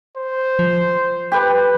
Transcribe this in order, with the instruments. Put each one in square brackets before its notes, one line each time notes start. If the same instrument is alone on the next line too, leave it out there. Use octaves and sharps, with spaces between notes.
[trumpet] C5
[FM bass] F3
[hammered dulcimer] G4 B4